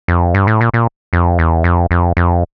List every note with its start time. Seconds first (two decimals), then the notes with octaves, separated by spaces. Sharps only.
0.08 F2
0.34 G2
0.47 A2
0.61 A#2
0.74 A#2
1.13 F2
1.39 E2
1.64 F2
1.91 F2
2.17 F2